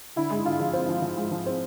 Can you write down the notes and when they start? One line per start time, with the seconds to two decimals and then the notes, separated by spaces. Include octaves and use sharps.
0.16 D3 E4
0.30 G#3
0.45 D3 F4
0.60 F3
0.73 C4
0.89 F3
1.02 F3
1.17 G#3
1.31 F3
1.46 C4